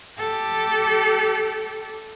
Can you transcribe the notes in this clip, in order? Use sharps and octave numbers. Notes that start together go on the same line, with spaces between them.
G4 A4